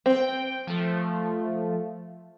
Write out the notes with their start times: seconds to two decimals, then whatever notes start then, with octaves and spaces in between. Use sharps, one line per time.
0.06 C4 G5
0.67 F3 A3